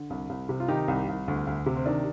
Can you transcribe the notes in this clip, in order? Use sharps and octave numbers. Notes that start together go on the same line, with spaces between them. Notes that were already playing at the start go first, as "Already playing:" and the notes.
Already playing: D3
C2
C2
C3
F4
D#3 D#4 G4
C2
C2
D2
D2
C3
C4
D#3 D4